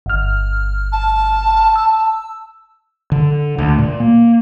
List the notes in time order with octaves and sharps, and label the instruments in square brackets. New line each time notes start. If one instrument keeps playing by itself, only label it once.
[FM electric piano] G1 F6
[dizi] A5
[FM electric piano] E6
[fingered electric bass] D3
D2
A#2
A#3